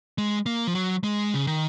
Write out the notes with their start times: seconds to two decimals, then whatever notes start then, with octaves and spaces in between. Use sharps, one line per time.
0.18 G#3
0.46 A#3
0.67 F3
0.75 F#3
1.04 G#3
1.34 C#3
1.47 D#3